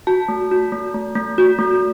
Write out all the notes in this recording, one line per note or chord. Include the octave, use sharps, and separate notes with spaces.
F#4 A5
A3
F#4
A3
A3
A3
F#4
A3